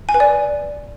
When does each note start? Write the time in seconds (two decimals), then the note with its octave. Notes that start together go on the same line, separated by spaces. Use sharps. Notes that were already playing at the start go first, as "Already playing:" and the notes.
0.09 G#5
0.14 B4
0.20 D5